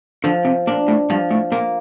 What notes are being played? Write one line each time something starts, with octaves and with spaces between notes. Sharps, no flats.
D3 F3
C3
A#2 D4
A2
G2 F3
A2
A#2 A#3